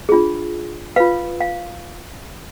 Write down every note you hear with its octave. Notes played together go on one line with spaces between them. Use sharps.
D4 F4 G#4
F4 B4 F5
F5